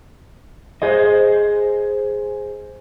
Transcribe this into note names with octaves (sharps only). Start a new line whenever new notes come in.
G#4 C5 D#5